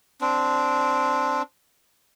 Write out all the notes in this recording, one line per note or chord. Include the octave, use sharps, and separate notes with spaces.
C4 D4